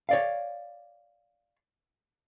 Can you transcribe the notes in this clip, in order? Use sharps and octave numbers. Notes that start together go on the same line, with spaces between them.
C#5 D5 F5